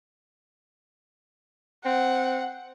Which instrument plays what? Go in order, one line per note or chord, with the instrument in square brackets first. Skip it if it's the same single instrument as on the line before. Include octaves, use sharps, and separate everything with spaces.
[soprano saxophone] C4 [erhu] F#5